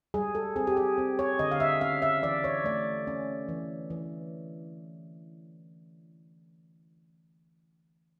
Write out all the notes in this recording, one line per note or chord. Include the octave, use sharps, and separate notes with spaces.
G3 G#4
A4
C4 G#4
G4
G#4
C4
C#5
D3 D#5
F5
E5
C#4 F5
E5
E3 D5
C#5
A3 D5
C#4
E3
E3